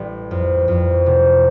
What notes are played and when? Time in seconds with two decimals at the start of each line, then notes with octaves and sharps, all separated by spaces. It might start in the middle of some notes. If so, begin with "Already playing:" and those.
Already playing: A1 G3
0.31 F2
0.68 F2
1.06 C3